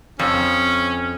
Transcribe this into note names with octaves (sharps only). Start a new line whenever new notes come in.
F2 C#4